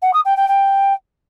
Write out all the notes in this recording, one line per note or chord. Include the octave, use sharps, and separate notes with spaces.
F#5
D#6
G5
G5
G5